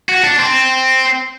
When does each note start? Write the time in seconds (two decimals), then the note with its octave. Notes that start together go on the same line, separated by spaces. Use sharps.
0.09 F#4
0.24 D4
0.39 C4